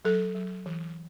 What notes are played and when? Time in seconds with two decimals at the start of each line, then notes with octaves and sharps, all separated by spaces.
0.05 F#3 A4
0.35 F#3
0.66 E3